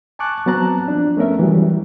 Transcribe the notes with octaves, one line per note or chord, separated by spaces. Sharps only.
G#5 A5 C#6 D6 F#6
F#3 B3 C4 A5 A#5 F#6
F3 D4
A3 B3 C#4 A#4 E5
E3 F#3 G3